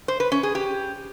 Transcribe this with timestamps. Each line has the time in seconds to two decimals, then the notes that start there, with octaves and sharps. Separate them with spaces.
0.08 C5
0.20 B4
0.32 C#4
0.43 G#4
0.55 G4